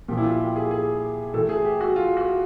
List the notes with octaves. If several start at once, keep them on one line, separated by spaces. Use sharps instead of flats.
A#2 F3 G4
E4
F4
G4
G#4
G#4
A2 E3 A4
G#4
G4
F#4
F4
F#4